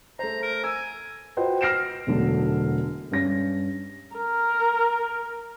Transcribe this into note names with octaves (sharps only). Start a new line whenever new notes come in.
A3 C5 A#5
A#4
G#5 E6
F4 F#4 B4 C5 D#5 G5
F6 A#6 C7 D7 E7
E1 B1 A2 D3 F#3 A4
G2 C#4 A#6
A#4